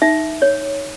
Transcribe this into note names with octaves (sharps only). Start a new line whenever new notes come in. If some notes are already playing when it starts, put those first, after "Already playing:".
D#4 E5
C#5